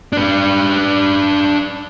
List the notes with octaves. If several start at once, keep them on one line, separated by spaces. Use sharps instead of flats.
D4 B4